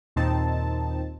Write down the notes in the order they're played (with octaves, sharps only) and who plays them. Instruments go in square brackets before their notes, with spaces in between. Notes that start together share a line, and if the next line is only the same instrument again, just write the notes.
[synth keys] D#2 A#2 C4 D#4 A5